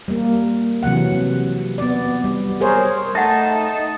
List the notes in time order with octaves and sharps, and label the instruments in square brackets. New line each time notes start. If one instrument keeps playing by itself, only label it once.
[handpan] G3 A#3
C3 E3 F#3 F#5
B3 D5
G3
G#4 A#4 C5 C#5
[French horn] A3 [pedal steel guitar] D#4 [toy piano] E5 F#5 [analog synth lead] A5